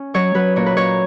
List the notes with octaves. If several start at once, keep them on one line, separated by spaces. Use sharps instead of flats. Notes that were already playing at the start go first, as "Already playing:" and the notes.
Already playing: C#4
F#3 C#5
F#3 B4
A#2 C#5
B4
A#2 C#5